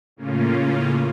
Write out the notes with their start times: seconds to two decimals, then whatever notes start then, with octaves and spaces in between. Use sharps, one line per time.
0.16 A2 C#3 A#3 C#4 F4